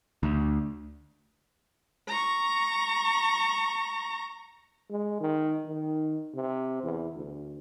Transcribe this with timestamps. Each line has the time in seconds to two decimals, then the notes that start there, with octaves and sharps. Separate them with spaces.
0.23 D2
2.08 A#5 C#6
4.90 G#3
5.20 D#3
5.65 D#3
6.35 C3
6.83 E2
7.15 D2